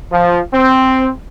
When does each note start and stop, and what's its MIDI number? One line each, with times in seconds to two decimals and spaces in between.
0.11 0.40 53
0.53 1.09 60